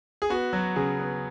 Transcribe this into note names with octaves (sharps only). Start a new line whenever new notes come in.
G#4
B3 F#4
F#3
C#3 G#4
B3